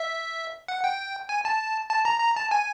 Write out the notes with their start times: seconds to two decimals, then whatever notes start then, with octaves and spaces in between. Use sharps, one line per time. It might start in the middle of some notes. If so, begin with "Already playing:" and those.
Already playing: E5
0.68 F#5
0.84 G5
1.29 G#5
1.45 A5
1.90 A5
2.05 A#5
2.20 A#5
2.37 A5
2.51 G#5